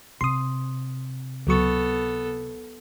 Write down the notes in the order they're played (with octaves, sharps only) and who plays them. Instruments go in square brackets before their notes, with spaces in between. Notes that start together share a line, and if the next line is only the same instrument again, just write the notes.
[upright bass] C3 [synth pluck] C6 D#6
[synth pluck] C#2 F#3 C#6 [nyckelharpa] B3 A4